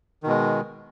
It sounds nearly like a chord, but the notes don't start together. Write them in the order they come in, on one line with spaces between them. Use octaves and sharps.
D#3 B2 G#3